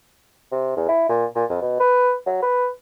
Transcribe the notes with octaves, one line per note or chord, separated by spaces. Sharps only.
C3
E2
E4
A#2
A#2
F2
B2
B4
F#3
B4